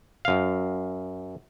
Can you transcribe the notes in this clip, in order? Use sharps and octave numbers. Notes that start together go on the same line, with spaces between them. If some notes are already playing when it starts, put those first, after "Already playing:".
F#2 F5